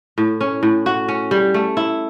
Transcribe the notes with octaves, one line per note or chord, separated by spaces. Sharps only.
A2
C#4
A2
F#4
C#4
G3
A3
E4